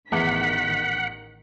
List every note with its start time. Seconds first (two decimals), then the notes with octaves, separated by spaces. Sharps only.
0.12 A1 E2 D#3 F#5 B6